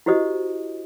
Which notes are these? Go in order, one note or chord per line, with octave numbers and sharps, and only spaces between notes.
E4 F#4 G4 C5 D#5 D#6